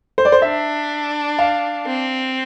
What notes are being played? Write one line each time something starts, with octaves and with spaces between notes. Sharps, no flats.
C5
D5
C5
D4 E5
F5
C4